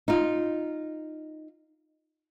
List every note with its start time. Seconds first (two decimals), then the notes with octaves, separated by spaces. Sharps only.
0.08 D#4 F4